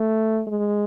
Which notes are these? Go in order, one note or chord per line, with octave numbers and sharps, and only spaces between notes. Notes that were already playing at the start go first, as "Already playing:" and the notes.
Already playing: A3
G#3